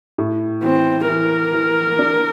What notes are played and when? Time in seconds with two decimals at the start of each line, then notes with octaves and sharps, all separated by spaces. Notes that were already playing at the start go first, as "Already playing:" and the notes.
0.18 A2
0.63 E3 C4
1.08 E3 A#4
1.53 E3
1.99 D4